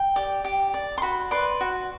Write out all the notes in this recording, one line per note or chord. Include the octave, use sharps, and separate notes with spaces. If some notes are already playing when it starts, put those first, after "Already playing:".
Already playing: G5
G4 D5
G4
D5
C6
F#4 B5
B4 D5 C6
F#4